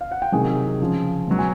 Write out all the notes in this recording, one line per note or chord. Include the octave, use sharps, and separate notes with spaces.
F5
F#5
G5
C3 D#3 F#3 G#4 G#5
C#3 F3
B2 F#3
G#5